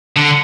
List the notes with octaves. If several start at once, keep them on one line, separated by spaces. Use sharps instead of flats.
D3